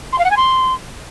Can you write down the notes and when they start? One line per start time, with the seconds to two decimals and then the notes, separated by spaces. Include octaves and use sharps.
0.12 C6
0.19 F5
0.25 F#5
0.31 G#5
0.37 C6